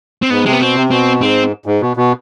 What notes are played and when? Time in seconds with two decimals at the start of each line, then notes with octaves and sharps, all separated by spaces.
0.22 C4
0.30 G#2 B3
0.46 C3 G#3
0.53 B3
0.60 B2 C4
0.75 C3
0.90 B2 C4
1.21 G#2 C4
1.66 G#2
1.81 B2
1.97 B2